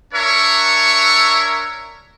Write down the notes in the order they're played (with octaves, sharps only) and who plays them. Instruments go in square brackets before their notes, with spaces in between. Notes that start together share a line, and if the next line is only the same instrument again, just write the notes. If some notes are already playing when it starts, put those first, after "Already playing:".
[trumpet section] D4 A#4 C#5 E5 C#6